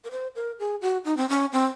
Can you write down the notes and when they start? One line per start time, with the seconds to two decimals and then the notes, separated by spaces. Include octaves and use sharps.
0.04 A#4
0.11 C5
0.36 A#4
0.59 G#4
0.81 F#4
1.05 D#4
1.17 C4
1.29 C#4
1.53 C4